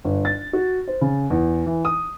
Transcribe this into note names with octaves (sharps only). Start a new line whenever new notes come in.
G1
A6
F#4
C5
C#3
E2
E3
D#6